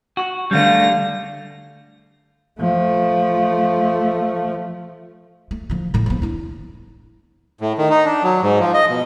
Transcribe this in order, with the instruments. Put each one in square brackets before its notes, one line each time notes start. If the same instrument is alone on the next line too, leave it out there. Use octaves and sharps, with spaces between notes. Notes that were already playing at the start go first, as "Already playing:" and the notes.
[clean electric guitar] F#4
[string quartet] D3 F5 A#6 [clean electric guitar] G3 A3
[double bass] F3 A3
[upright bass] A3
D3 F3
A2 F#3
F3 B3
D4 E4
[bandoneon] A2
D#3
D#4
D4
F#3
G#2
F3
D#5
B2